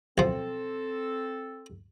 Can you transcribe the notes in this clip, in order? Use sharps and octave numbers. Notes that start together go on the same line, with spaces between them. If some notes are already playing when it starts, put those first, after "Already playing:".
B1 F3 C4 A4